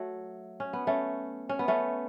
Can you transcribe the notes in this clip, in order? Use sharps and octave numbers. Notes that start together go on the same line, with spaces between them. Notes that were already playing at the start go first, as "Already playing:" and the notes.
Already playing: F#3 A3
C#4
B3
A3 C#4
C#4
B3
A3 C#4